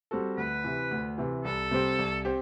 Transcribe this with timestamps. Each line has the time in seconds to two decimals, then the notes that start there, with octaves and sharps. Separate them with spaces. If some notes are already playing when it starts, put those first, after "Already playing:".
0.11 G3 C4 F#4 A4
0.37 D2 B4
0.64 C3 E3
0.91 D2
1.18 C3 E3
1.44 C2 A4
1.71 C3 G3 C4 G4
1.99 C2
2.25 C4 G4